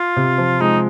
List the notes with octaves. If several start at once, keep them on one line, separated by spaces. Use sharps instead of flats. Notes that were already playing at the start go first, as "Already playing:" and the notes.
Already playing: F4
C3
F3
G#3 D#4